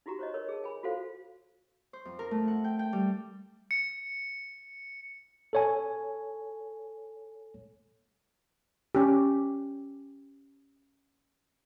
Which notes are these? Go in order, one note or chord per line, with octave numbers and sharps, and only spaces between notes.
D#4 E4 F#4 G4 A#5
C5 C#5 D#5
A#4 B4 C#5
G#4 A5
G#5 B5
F4 F#4 A4 C5 F5
C5
F2
A#4
A3
F#5
G5
G5
G3
C#7
A4 C#5 G#5
C#4 G4